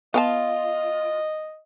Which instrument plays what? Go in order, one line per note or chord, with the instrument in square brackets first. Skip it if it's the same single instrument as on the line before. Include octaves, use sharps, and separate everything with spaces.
[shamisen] B3 G5 A5 [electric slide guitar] F4 [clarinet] D#5